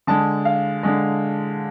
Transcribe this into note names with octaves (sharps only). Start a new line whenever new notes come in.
D3 G#3 A5
F5
D3 G#3